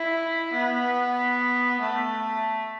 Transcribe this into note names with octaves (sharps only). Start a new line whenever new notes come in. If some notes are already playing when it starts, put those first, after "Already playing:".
Already playing: E4
B3
A3